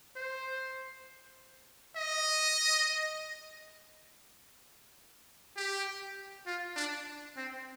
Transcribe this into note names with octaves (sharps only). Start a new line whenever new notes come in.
C5
D#5
G4
F4
D4
C4